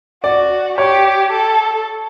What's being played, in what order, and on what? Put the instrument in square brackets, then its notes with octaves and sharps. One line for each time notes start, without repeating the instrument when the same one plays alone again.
[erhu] F#4 [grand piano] D5
[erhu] G4 [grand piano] C#5
[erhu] A4